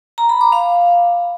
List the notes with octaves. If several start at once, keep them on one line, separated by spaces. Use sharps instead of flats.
A#5
B5
D6
F5